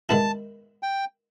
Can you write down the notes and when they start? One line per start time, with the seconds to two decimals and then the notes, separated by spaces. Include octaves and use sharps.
0.09 G2 D#3 G#3 B3 E4 A5
0.83 G5